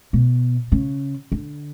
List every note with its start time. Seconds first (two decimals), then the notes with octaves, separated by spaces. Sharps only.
0.13 B2
0.72 C#3
1.32 D3